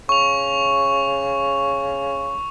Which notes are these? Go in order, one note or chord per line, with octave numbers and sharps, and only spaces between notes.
C#3 C#6 F7